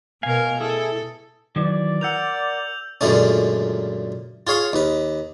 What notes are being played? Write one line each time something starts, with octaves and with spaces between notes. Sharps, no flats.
B2 A#4 F5 G#5
E4 G#4 A4
D#3 E3 F#3 D5
A#4 F#5 E6 G6 F7
C#2 F#2 A#2 D3 A3 C#4
F4 G#4 C#5 F5
D#2 B4